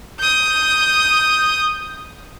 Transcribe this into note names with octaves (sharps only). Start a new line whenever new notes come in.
D#6 G6